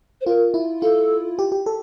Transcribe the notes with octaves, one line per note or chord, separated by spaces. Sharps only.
C5
F4 A#4
E4
F4 A4
G4
G4
A4